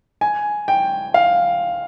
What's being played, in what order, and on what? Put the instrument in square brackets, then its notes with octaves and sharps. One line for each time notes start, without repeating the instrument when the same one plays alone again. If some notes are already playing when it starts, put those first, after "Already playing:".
[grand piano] G#5
G5
F5